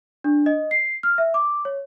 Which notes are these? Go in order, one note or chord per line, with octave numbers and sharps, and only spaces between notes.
D4
D#5
C7
F6
E5
D6
C#5